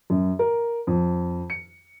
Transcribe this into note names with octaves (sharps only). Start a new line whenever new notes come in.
F#2
A#4
F2
C#7